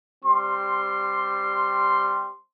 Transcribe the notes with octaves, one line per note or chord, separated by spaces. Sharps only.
G3 C4 C6